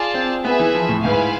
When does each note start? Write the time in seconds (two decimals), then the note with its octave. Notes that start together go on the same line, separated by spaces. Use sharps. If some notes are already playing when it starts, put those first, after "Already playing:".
Already playing: F4 G#4 D5 A5
0.14 C4
0.44 B3 G#4 B4 E5 G#5
0.59 E3
0.74 F3
0.89 A2
1.04 G#2 E4 B4 F5 G#5